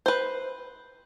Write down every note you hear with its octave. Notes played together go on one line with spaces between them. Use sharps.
B4 C5